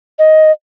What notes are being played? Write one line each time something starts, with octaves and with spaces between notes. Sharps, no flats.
D#5